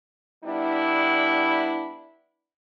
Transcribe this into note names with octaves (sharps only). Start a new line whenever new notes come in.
G3 B3 D4 E4